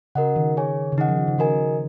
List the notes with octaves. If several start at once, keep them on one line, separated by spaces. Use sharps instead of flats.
C#3 F#4 A#4 D#5 F#5
D#3
G#4 C#5 G#5
C#3
D#3 D#4 G#4 D#5 F#5
F3
D#3
C#3
D#3 F#4 A#4 D#5 G#5